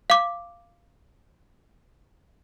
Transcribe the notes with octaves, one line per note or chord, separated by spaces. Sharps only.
F5 D6